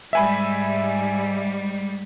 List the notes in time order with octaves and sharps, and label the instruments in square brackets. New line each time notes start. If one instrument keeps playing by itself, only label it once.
[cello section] G#2 G3 [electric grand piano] E5 G#5 B5